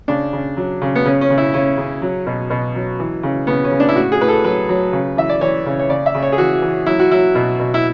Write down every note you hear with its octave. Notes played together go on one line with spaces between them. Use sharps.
C#3 D4
C#3
F#3
C#3
B3
C#3 C#4
C#4
C#3
E4
C#3 C#4
C#3
F#3
B2
B2
F#3
E3
C#3
C#3 B3
C#4
C#3
D4
E4
A2 F#4
G#4
A2 B4
A4
F#3 B4
F#3
C#3
E3 E5
D5
E3 C#5
C#3
C#5
C#3 D5
E5
C#3
C#5
G#4
E3 F#4
E3
F#3 E4
F#4
F#3 E4
B2
B2
E4